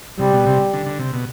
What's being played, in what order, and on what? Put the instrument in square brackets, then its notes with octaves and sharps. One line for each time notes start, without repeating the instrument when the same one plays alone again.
[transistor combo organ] C3 [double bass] G3
[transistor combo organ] B2
C3
D3
D3
C3
B2